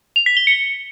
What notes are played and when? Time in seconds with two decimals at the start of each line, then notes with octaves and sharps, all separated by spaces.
0.16 F7
0.26 B6
0.37 G7
0.47 C#7